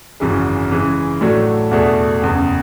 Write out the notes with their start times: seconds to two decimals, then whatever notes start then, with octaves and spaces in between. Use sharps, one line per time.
0.20 G#1 F#2 C#3 E3 G#3
0.71 C#3 E3 G#3
1.21 A2 F#3 A3 D4 F#4
1.71 E2 B2 A3 D4 G#4
2.22 F#1 E2 C#3